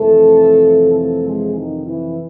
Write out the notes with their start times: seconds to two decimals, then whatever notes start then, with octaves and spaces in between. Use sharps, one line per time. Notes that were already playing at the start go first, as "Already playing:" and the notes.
Already playing: F2 C3 E3 A3 A4
0.94 A3 A4
1.24 G#3 G#4
1.55 D#3 D#4
1.85 E3 E4